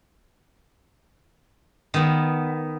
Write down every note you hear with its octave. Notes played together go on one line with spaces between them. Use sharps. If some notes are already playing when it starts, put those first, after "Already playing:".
D#3 B3